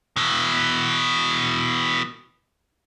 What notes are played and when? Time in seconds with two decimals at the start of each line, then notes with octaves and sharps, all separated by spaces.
0.16 B2 E3